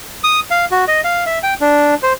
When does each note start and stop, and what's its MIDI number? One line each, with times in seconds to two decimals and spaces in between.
0.24 0.40 87
0.51 0.65 77
0.71 0.85 66
0.88 1.01 75
1.04 1.25 77
1.26 1.39 76
1.43 1.54 79
1.61 1.95 62
2.03 2.13 72